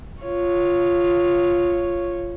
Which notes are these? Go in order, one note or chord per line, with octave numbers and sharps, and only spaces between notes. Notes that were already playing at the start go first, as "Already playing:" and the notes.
F4 C#5